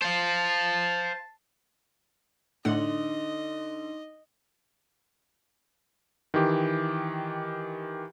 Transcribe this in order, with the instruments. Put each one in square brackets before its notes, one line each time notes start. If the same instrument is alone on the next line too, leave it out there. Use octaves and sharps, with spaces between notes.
[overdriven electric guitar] C5 F5 [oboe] A5
[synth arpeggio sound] A2 A3 F#5 [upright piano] D3 [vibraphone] D#4 C6 D6 [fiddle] D#5
[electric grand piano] D#3 E3 G4